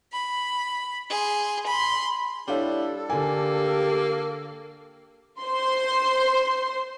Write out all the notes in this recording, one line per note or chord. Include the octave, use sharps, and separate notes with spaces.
B5
G#4 C6
B5 C6
G3 D4 E4 A4 C#5 F5
D3 A#3 G4 G#5
C5 C6